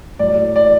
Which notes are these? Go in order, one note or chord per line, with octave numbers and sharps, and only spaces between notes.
A2 F#3 D5
D5